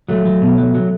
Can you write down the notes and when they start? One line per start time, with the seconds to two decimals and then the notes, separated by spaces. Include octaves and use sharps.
0.09 F#3 A3
0.25 F#3
0.42 B2
0.58 F#3
0.75 F#3